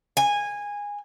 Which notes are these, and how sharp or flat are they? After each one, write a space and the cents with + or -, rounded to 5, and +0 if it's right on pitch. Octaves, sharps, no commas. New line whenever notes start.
G#5 -15